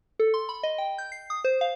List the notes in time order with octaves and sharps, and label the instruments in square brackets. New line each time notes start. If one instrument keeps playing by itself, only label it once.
[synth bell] A4
C6
B5
D#5
G5
G6
C7
D#6
C5
F5